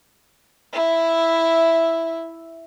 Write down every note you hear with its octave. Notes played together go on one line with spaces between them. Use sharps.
E4 E5